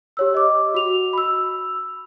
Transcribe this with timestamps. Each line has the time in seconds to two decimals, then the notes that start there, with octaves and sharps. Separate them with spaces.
0.17 G4 C#5 E6
0.34 D#5 D6
0.74 F#4 F7
1.13 B5 E6